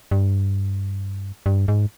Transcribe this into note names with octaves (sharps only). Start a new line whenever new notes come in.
G2
G2
G#2